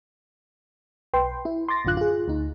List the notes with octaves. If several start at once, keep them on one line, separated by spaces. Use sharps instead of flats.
B1 B4 G5 C6
E4
C6 D6 A6 A#6
A1 F#2 D3 F4 F#6
F4 G#4
D2 D#4